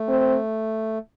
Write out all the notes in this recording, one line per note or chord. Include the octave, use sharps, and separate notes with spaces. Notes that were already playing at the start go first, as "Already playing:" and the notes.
Already playing: A3
C4